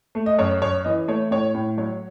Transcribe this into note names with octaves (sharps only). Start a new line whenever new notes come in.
A3
D#5
F#2 C#5
F#2 C#5
E3 D#5
A3 C#5
A2 C#5
A2
F#3 C#5